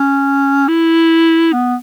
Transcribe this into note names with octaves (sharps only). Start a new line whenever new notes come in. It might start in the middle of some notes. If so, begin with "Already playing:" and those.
Already playing: C#4
E4
B3